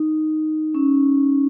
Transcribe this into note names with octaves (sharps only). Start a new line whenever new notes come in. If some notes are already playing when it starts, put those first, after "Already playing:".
Already playing: D#4
C#4